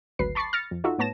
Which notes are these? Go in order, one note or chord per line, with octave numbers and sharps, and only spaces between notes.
G#1 D2 F#3 B4 C7
A5 B5 C#6 D6 A6 C7
F6 A6 A#6 C#7
F2
D#4 F4 F#4 A4 E5
A2 B3 C#5 A5 A#6 E7